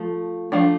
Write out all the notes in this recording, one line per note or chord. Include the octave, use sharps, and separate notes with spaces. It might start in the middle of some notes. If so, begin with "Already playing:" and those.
Already playing: F3 A3
F3 A3 D4